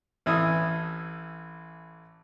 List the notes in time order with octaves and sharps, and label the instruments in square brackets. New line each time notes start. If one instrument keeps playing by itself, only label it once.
[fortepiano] A1 E3 D#6